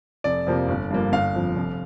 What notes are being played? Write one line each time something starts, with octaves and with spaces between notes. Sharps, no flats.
F1 D5
F2 C3 F3 A#3
G1
G2 F3 A#3
G1 F5
F2 F3
F1